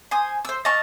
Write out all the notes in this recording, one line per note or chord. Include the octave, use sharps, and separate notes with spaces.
C5 G#5 D#6
C5 E6
D#5 F5 A5 C#6